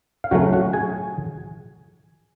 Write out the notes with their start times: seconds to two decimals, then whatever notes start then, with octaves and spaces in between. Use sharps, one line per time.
0.24 F5
0.31 C#3 F#3 A3 C#4 F#4 F#5
0.53 F#4 F#5
0.73 G#4 G#5